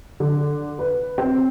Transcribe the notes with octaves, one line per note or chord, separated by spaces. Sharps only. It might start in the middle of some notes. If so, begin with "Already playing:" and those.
D3
B4
C4